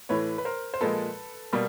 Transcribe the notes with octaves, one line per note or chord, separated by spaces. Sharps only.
A2 E3 A3 B4 C#5
B4
A#4 C5
C5
A#2 F3 G#3 A4 B4
B2 G3 A#3